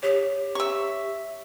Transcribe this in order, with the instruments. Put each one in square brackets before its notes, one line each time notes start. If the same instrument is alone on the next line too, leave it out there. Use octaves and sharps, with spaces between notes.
[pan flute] G4 [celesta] C#5
[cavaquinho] E5 C#6